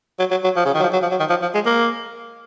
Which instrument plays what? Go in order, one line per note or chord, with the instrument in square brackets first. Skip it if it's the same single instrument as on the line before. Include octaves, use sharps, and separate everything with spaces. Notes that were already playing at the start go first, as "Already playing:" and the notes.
[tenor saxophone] F#3
F#3
F#3
F3
C#3
D#3
F#3
F3
F#3
F3
F#3
D#3
F3
F3
G#3
A#3